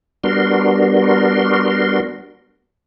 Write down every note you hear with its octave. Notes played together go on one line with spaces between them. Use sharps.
G3 B3 D4 F#4 A#4 C6